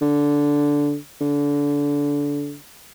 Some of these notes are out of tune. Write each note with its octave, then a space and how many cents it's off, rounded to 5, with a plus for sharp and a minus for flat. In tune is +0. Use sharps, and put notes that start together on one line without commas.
D3 -10
D3 -25